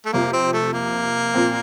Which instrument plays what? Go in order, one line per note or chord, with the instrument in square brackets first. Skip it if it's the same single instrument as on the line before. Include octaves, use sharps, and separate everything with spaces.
[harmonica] A3
[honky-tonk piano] F2 C3 F3 [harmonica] A#3
[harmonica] C4
A3
A#3
[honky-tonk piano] A#2 F3 C4